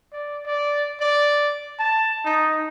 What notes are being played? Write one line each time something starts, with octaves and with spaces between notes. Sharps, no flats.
D5
D5
D5
A5
D#4